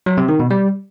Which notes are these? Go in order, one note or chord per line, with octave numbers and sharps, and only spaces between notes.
F#3
C3
D#3
B2
G3